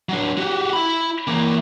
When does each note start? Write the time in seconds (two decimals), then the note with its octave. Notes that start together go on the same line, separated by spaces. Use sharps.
0.09 F#3 D4
0.38 F#4 G4
0.73 E4 B5
1.27 E3 A#3